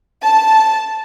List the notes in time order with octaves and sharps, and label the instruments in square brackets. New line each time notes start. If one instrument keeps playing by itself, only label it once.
[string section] A5